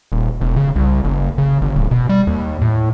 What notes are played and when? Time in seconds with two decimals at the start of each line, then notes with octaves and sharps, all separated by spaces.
0.12 D#1
0.41 E1
0.56 C#3
0.76 C2
1.04 F#1
1.38 C#3
1.61 G1
1.75 D1
1.91 B2
2.09 G3
2.27 D#2
2.62 A2